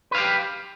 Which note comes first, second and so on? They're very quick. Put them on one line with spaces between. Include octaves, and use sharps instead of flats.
B4 F5 G4